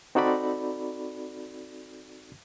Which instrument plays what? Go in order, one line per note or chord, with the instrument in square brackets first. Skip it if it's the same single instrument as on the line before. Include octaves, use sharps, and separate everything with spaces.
[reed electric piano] C4 D#4 F#4 A4 D5 B5